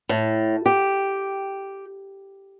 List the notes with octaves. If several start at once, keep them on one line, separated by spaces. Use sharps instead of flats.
A2
G4